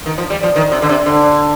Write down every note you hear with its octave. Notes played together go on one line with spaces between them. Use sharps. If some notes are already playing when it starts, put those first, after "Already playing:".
D#3
F3
G3
F3
D#3
C3
D3
C3
D3